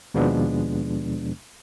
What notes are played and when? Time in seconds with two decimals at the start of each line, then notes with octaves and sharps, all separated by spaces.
0.14 D#2 B2 F3 G#3 B3 D4